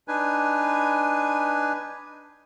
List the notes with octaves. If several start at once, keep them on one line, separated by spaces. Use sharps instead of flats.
D4 D#4 B4 G#5